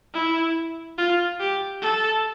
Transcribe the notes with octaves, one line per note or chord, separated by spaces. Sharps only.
E4
F4
G4
A4